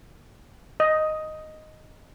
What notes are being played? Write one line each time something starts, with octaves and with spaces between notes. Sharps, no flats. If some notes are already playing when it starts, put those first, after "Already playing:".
D#5